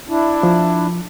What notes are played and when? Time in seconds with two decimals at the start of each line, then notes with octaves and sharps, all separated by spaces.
0.09 D4 E4
0.43 F3